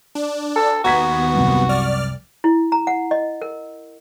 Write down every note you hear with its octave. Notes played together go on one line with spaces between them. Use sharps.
D4
A4
D#2 B3 F#4 A#5 G#6 B6
C2 F#2 C3
D5 F6
E4
A#5
F#5
D#5
A#4